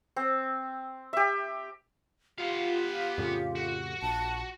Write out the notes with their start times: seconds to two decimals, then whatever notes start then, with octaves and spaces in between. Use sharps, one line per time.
0.16 C4
1.13 G4 E5
2.38 B3 F4 G4 F5
3.18 F2 A2 C#3
3.55 F#4
4.02 A#1 A5